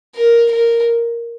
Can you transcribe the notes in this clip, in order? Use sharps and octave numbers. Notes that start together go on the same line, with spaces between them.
A#4
A#4